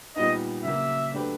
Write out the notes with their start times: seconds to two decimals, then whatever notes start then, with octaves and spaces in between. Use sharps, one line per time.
0.16 A#2 G3 B3 D#4 D#5
0.64 C#3 F#3 A#3 E5
1.12 F#3 A3 D4 G4 B4